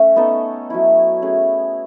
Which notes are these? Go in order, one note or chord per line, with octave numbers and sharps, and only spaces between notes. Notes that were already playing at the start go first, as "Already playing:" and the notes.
Already playing: A3 C#4
B3 D#4 A4
F#3 C#4 E4
A3 C#4 G#4